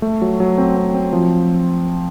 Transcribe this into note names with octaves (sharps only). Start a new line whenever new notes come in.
A3
F#3
F#3
C4
C4
C4
F3